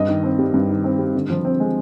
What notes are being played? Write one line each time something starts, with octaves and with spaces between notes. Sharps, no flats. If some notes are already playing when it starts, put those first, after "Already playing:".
Already playing: G2 D#5
D#3
C4
G3
G2
D#3
C4
G3
D3
F3
C4
G#3